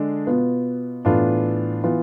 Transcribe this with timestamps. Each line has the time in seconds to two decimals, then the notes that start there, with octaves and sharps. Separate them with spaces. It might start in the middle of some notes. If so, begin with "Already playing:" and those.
Already playing: D3 G#3 D4
0.27 B2 B3 F4
1.05 A2 E3 B3 D4 F4
1.84 E3 B3 F4